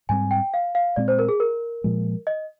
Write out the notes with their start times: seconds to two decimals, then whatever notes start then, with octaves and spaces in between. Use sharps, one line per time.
0.09 G#2 G3 C4 G#5
0.31 G5
0.54 F5
0.75 F5
0.96 A#2 G#3 C4 D5
1.08 C5
1.19 A#4
1.29 G#4
1.40 A#4
1.84 A#2 F3 G#3
2.27 D#5